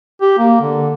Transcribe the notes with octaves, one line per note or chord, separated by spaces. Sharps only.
G4
A#3
D3